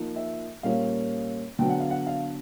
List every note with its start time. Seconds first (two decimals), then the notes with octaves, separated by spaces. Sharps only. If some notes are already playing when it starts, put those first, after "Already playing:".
Already playing: F3 A#3 D#4
0.16 E5
0.63 A#2 G3 A#3 C#4 F5
1.59 D3 F#3 B3 G5
1.69 F#5
1.80 F5
1.90 F#5
2.07 F5